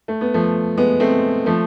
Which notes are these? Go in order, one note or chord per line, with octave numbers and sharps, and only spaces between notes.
A3
B3
F3 A3
G#3 B3
A3 C4
F3 A3